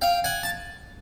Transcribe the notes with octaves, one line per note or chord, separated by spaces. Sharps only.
F5 G5
F#5 G#5
A5